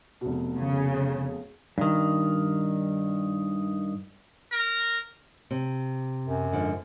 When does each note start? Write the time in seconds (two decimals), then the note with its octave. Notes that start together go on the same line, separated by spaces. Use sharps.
0.21 F1 B2
0.58 C#3
1.78 G2 D#3
4.52 A#4
5.51 C3
6.25 F#2
6.52 G#2 D3 F3